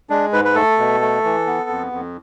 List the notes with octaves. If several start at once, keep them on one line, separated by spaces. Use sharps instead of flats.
G#3 D4
G#2 B4
B4
A3 A4
B2
A3
E3
B3
F2
F2